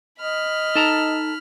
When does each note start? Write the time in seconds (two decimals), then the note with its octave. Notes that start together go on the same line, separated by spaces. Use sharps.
0.20 D#5 B5 F6
0.76 D#4 A4 A5 A#5